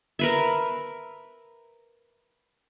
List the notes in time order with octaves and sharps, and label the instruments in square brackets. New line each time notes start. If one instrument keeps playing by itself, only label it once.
[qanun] A#4 B4 E5